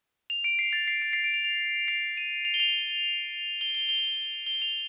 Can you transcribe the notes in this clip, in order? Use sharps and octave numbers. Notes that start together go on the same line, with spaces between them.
F7
D7
C7
A6
C7
D7
C7
D7
F7
F7
C7
D#7
F7
G7
F7
G7
G7
G7
G7
F7